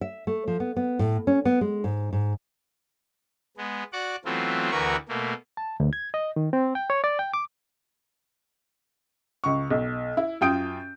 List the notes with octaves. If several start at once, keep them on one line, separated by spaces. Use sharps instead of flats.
E5
A3
F3
B3
B3
A2
C#4
B3
G#3
G#2
G#2
G#3 B3
F#4 D5 F#5 D6
E3 F#3 A3 B3 C4 F4
D2 E3 F#4 A#4 B4 C#6
B2 A3 A#3
A5
D2
G#6
D#5
D#3
C4
G5
C#5
D5
G5
D6
C#2 C#6
B1
E4
F#2 F4 G5 D#6 G6 D7